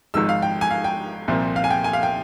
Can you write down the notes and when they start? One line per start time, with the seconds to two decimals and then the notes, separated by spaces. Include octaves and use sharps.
0.14 G#1 G#2 F3 G#3 E6
0.29 F5
0.42 G5
0.61 G#5
0.71 F5
0.84 G5
1.28 C2 A#2 F3 C4
1.56 F5
1.64 G#5
1.70 G5
1.84 G#5
1.93 F5
2.03 G5